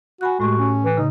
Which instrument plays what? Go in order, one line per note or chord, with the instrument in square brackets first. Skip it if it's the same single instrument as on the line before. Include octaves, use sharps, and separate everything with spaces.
[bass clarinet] F#4 [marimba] G#5 B5 F#6
[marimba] A2 A3 G4 [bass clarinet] G#3 [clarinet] F#4
[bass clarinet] C#4
[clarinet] E3
[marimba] C#3 [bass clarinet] D#4